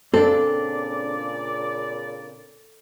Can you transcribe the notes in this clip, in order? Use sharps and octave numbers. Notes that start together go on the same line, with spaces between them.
A#2 C#3 C4 D4 A4 D5